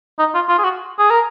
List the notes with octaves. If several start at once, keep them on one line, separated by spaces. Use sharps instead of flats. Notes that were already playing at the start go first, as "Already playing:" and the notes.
D#4
F4
F4
G#4
F#4
G#4
A#4